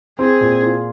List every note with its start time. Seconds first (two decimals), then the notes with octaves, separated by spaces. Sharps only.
0.19 C4 G#4
0.41 A#2
0.63 F4